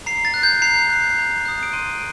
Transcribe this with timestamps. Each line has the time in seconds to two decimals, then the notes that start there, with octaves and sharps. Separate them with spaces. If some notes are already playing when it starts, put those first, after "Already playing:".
0.06 A#5 C7
0.25 A6
0.34 F#6
0.43 G6
0.62 A#5 C7
0.90 F#6
1.18 A#5
1.45 D#6 F#6
1.63 D7
1.73 C6 D#7